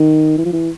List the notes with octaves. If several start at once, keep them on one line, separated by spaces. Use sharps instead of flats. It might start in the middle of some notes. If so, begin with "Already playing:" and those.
Already playing: D#3
E3
F3
E3